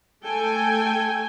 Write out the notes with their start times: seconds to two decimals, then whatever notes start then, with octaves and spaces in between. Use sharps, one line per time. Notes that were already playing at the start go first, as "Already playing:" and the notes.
0.25 A3 A4 G5 G#5